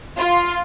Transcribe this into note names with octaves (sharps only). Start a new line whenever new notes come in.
F4